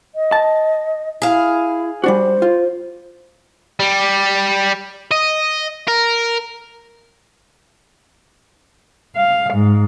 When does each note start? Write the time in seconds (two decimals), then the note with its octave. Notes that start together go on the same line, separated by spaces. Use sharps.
0.15 D#5
0.32 A5
1.22 E4 G#4 F5
2.04 G3 D4 F#4 C5
2.42 F4
3.80 G3
5.11 D#5
5.88 A#4
9.15 F5
9.54 G#2